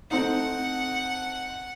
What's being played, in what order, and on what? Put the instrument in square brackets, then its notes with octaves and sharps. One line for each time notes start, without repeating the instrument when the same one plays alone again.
[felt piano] A3 C4 D#4 [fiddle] F#5